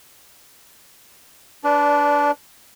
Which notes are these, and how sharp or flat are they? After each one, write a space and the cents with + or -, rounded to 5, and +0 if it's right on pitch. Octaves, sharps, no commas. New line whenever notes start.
D4 -15 B4 +0 D5 +0